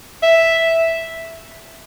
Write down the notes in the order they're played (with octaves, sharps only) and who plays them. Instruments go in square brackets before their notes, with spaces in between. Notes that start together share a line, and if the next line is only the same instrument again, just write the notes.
[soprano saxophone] E5